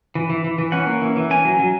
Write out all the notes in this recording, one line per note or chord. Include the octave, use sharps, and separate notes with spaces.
E3
E3
E3
E3
C#4 F#5
A#3
E3
E3
C#4 G#5
F#3
F#3